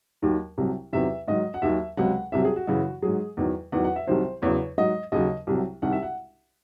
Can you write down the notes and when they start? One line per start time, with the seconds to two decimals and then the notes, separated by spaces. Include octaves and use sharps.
0.22 D#2 D#3 F#3
0.57 C2 C3 F#3
0.93 E2 C3 D#3 F#3 E5
1.28 G#2 D#3 F#3 D#5
1.54 F#5
1.62 D#2 D#3 F#3 E5
1.97 C#2 C3 F#3 F#5
2.32 C2 C3 F#3 E5
2.45 G#4
2.56 F#4
2.67 F#2 C#3 E3 F#4
3.02 G#2 F#3 G#4
3.37 E2 D#3 F#3
3.72 E2 D#3 F#3 F#5
3.84 F#5
3.96 E5
4.07 C2 C3 D#3 F#3 C5
4.42 E2 C#3 F#3 C#5
4.78 G#2 F#3 D#5
5.12 D#2 C#3 F#3 D#5
5.47 C2 C3 F#3
5.82 C2 C3 D#3 F#5
5.92 E5
6.02 F#5